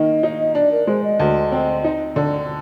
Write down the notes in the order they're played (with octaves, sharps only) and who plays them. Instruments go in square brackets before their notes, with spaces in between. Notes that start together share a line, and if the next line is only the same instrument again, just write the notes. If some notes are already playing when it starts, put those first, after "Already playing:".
Already playing: [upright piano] D#3 A#3 [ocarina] D#5
[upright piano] D#4
[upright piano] D4 [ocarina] D5
[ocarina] A#4
[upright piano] G#3 [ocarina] C5
[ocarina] D#5
[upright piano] D2
C4
D#4
D3